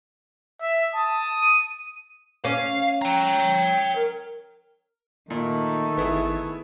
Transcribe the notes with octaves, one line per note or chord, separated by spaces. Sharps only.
E5
A5 D#6
D#7
C#4 F5
C#5 G5 A#5
A#4
A#2 D#3 A3
G#1 B3 E4 G#4